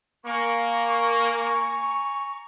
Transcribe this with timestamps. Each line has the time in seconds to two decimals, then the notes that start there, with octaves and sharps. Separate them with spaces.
0.26 A#3 G#5 A#5 C#6